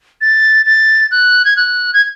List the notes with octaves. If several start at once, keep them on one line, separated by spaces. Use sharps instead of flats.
A6
A6
F#6
G#6
F#6
G#6